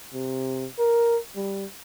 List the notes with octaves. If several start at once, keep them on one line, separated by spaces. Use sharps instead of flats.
C3
A#4
G3